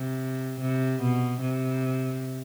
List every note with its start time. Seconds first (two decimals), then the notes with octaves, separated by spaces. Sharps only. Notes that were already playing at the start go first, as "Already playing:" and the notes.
Already playing: C3
0.61 C3
1.02 B2
1.42 C3